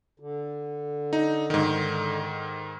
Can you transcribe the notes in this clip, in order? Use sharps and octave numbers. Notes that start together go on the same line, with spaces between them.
D3
D#4
G#2 D#3